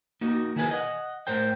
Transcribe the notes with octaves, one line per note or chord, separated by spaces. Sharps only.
A#3 D#4 F#4
D#3 E4 G#4 A#4 B4 G#5
D#5 F#5
A2 A#4 C5 G5